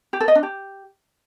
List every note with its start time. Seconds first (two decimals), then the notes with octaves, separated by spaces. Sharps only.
0.13 G4
0.21 A4
0.28 D#5
0.35 D4
0.43 G4